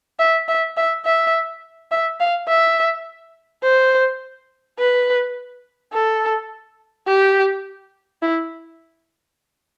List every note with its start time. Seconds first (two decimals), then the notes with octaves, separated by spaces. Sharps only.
0.19 E5
0.48 E5
0.77 E5
1.05 E5
1.91 E5
2.20 F5
2.48 E5
3.63 C5
4.79 B4
5.93 A4
7.07 G4
8.22 E4